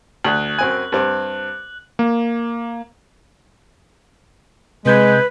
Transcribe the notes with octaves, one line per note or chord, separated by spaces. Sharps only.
D2 F#6 F#7
F#2 C4 G#5
G2 C4
A#3
C3 G#3 B4 G6 G#6